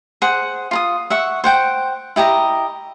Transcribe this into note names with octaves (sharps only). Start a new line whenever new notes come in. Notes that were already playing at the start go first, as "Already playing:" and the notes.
G#4 C5 F#5
F4 A#5 D#6
E5 F#5 C#6
C5 F#5 G5
E4 G4 D#5 A#5